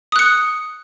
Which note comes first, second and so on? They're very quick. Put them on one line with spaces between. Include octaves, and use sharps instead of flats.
D#6 F#6 C#7